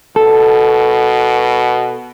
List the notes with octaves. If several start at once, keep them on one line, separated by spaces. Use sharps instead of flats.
B2 A4